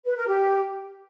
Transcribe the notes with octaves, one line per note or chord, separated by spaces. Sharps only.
B4
A#4
G4